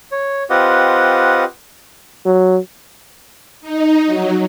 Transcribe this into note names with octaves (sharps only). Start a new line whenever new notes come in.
C#5
C4 F4 G4 B4 D#5 F#5
F#3
D#4
F#3